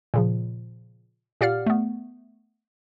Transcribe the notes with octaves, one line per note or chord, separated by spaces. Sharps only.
A#2 C#3 F3
A#2 G4 D5 F5 F#5 F6
A3 B3